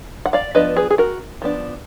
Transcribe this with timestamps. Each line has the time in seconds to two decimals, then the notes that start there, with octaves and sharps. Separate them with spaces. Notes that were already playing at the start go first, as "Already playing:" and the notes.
0.26 F#5
0.33 D5 F5
0.55 F3 B3 D4 B4 D#5
0.76 G#4 B4
0.90 G#4
0.98 F#4 A#4
1.42 F3 B3 D4